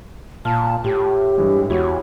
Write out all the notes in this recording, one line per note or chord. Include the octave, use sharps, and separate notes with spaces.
A#2 F4 A5 F6
A2 G4
G2 E3 G#3
E2 E4 F#4 G4 C#5